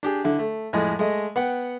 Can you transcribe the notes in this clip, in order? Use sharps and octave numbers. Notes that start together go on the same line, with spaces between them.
D4 G4 G#4
D3 E4
A3
F2 A2 G#3 D#5
G#3 A3 D#5
B3 F#5 G5